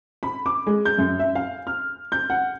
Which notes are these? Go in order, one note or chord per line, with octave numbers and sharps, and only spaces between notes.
B5
D6
G#3
G6
F#2
E5
F5
F6
G6
F#5